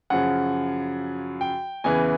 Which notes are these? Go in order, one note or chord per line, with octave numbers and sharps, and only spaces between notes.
F#2 C#3 F3 F#5
G5
E2 C#3 E3 G#5